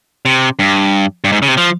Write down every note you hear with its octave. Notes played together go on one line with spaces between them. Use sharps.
C3
G2
G2
G#2
C#3
C3
F3